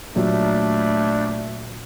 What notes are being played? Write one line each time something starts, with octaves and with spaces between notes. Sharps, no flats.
A#2 F#3 G3 A3 D4